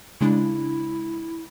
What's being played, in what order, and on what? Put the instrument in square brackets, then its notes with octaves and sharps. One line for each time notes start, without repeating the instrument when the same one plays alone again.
[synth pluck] C#3 G#3 D4 [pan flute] E4